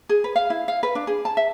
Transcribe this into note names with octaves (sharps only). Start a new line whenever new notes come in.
G#4
B4
F5
E4
F5
B4
D4
G#4
A5
E5